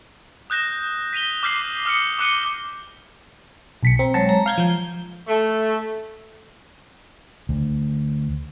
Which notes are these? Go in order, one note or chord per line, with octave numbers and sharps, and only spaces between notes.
D#6 F#6 G6 A#6 E7
B6 D#7 F7 G7
D6 F6 G6 B6 C7 F#7
D#6 F6 C7 C#7
D6 D#6 F#6 C#7 D#7 G7
B1 B6 C#7
C4 A#5
F#3 G#3 C#5 A5
A#5
F5 G6 G#6
F3 G6
A3
D2